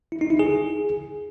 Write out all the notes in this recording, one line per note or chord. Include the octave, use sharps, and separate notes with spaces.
E4
D#4
E4
G#4